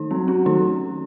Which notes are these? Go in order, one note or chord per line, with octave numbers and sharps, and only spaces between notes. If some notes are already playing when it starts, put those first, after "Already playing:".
Already playing: D#3 D#4
F#3 C4
C#4 F#4
D#3 F#3 D#4